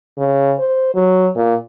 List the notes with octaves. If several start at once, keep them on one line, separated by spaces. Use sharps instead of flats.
C#3
C5
F#3
A#2